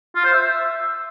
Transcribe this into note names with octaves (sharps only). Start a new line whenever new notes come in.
F4
C5
E5